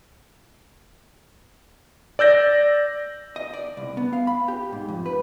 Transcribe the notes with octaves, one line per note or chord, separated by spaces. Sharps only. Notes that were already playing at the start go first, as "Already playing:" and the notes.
D5 E6 G6 A#6
D#5
D5
C2
B3
F5
B5
G4
G#2
F2
B4